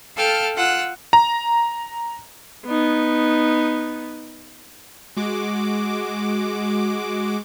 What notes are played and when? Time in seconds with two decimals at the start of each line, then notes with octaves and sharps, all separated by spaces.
0.17 A4 F5 G5 A5 F6
0.56 F4 F#5 E6 F#6
1.13 A#5
2.66 B3 D#4
5.17 G#3 F#4 D6